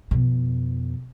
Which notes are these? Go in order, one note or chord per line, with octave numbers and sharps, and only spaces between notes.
F2 B2